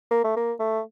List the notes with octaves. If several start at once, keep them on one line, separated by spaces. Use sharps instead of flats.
A#3
A3
A#3
A3